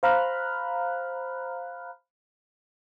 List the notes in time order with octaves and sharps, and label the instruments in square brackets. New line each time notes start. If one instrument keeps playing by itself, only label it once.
[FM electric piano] C5 F5 A#5 B5 F6 F#6